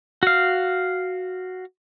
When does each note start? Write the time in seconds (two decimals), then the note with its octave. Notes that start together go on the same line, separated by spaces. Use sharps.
0.23 F#4 F5